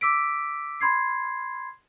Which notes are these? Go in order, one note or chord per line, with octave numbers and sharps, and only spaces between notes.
D6 E6 B6 D7
B5 C6 G#6 C7